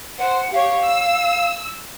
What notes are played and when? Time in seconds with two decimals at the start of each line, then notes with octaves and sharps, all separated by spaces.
0.18 C5 F#5
0.52 G4 C#5 F5
0.84 E6